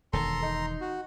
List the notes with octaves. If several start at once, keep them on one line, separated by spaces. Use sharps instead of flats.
E1 D#3 A4 A#5 C6
D#4
F#4